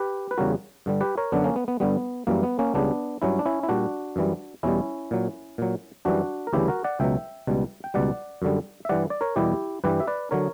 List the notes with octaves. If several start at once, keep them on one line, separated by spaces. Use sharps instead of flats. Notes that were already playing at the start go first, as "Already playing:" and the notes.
Already playing: G4 B4
B4
E2 C#3 G3 F#4 A#4
G2 D3 G3
G4 B4
A#4 C#5
F#2 D3 F#3 B3 D4
A#3 C#4
B3
B3
G2 D3 G3 B3
F#2 E3 G3 A#3
B3
A#3 C#4
C#2 C#3 G3 B3 D4
G2 F#3 C#4 E4
D4
C#4 E4
E4
A#2 G3 D4 F#4
F#2 E3 G3
E2 B2 G3 C#4 E4
A#2 F#3
A#2 F#3
F#2 E3 G3 D4 F#4
A#4
D2 C#3 E3 G3 E4 G4
F#4 A#4
D5 F#5
C#2 B2 F#3 E5 G5
C#2 B2 G3
G5
C#2 B2 G3 D5 F#5
F#2 D3 G3
E5
G2 E3 G3 D5 F#5
D5
A#4 C#5
E2 B2 G3 E4 G4
G2 E3 G3 G4 B4
E5
B4 D5
D3 F#3 A#4 C#5